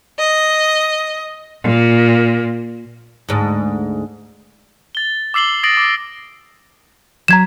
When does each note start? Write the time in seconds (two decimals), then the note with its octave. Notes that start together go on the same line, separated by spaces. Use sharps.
0.18 D#5
1.63 A#2
3.29 D2 G#2
4.95 A6 G7
5.34 D6 E6 C7 F#7 G7
5.63 D#6 A6 A#6 C7 D7 F#7
5.77 D6 C7
7.28 F#3 A#5 G#6 B6 C7 E7